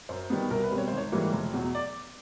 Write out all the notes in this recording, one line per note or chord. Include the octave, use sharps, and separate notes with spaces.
F#2 C5
D#3 G3 B3
C2 A#4
B4
B2 G3 C4
C#5
G#1 C5
C#5
G#2 E3 G3 A#3
F1
E2 B2 F#3
D5